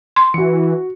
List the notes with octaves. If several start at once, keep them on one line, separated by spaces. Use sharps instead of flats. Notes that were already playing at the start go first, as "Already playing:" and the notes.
C6
E3 F#4 C#7